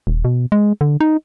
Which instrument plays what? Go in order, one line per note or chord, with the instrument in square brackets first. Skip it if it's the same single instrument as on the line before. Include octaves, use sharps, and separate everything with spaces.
[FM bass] D#1
B2
G#3
D3
D#4